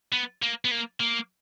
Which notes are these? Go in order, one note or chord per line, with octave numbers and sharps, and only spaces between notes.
B3
A#3
B3
A#3
A#3